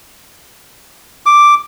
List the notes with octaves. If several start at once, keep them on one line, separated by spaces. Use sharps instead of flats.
D6